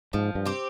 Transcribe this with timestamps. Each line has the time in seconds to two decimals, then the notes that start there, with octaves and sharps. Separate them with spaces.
0.13 G#2 F3
0.35 G2
0.46 C4 G4